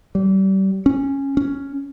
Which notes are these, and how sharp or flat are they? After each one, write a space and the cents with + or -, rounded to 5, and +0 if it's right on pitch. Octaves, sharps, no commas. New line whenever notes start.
G3 -30
C#4 -10
C#4 +0